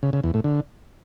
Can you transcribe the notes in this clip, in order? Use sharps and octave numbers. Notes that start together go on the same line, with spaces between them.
C#3
C#3
E2
A2
D3